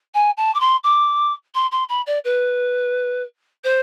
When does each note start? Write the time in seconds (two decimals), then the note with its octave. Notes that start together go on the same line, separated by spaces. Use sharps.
0.14 G#5
0.37 A5
0.54 D6
0.60 C6
0.83 D6
1.54 C6
1.71 C6
1.89 B5
2.06 D5
2.24 B4
3.64 C5